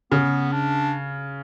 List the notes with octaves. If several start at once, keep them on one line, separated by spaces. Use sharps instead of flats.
C#3 B3
D4